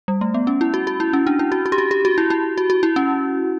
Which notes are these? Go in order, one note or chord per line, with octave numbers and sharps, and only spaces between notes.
G3
A3
B3
C#4
E4
F#4
F#4
E4
C#4
D4
E4
F#4
F#4
G4
F#4
G4
F#4
E4
E4
F#4
F#4
E4
C#4